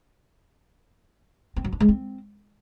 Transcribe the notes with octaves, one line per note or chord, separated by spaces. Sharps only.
C4
F#3
D4
G#3
C4